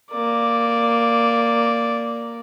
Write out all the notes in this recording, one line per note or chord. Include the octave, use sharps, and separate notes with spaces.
A#3 D5